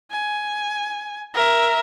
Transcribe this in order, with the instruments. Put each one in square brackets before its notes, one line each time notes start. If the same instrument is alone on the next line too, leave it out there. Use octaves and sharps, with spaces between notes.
[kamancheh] G#5
A#4 E5